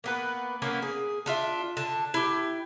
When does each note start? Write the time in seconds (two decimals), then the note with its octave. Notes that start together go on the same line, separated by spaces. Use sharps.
0.04 A#3 B3 B4
0.62 A#3 B3 C#4
0.82 G#4
1.26 D4 F4 E5
1.77 D3 A5
2.14 E4 G4